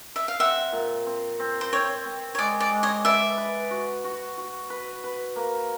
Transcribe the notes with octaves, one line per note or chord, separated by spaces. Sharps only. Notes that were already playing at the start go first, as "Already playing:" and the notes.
E5
F5
C4 E5 F#5
A#2
C4
C4
C5
C4 C#5
C4
C#5
G#3 D5
D5
G#3
C#5 D#5
B4 D5 E5
B4
F#4
F#4
F#4
B4
B4
A#3